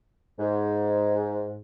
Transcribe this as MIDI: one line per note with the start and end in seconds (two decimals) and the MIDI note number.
0.38 1.58 44